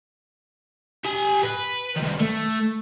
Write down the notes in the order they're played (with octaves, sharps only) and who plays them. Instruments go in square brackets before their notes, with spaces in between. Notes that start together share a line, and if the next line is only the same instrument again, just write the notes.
[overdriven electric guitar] G4 G#5
B4
C2 D#3
A3